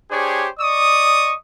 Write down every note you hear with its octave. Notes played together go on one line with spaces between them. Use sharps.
D4 G4 G#4 C5 C#5
D5 D#5 C#6 D#6